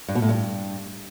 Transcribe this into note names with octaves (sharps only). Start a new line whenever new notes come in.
G2
B2
A2
G2